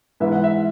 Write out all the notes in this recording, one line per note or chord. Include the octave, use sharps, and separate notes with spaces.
G#2 E3 G#3 B3 E5
F#5
E5